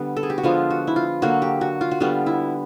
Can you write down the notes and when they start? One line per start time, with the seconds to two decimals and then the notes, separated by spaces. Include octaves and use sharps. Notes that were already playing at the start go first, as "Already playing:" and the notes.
Already playing: D3 G3 B3
0.17 A4
0.23 G#4
0.30 G4
0.38 F#4
0.43 D3 F3 G#3 B3 F4
0.70 F#4
0.87 E4
0.96 F4
1.22 D3 F#3 A#3 F#4
1.42 G4
1.61 F#4
1.81 F4
1.91 F#4
2.00 D3 G3 B3 F4
2.26 E4